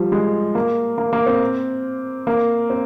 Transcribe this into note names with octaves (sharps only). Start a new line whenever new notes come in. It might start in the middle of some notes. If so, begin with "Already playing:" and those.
Already playing: F3 G3
G#3
A#3
A#3
A#3
C4
A#3
C4